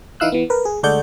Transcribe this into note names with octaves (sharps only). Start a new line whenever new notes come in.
E3 D#4 E4 F5 E6 F#6
E3 B3
A#4 B4
G#4
D2 G#3 A4 D5 F#5 G6